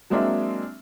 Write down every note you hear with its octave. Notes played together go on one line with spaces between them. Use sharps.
F#3 G#3 A#3 C4 D4 E5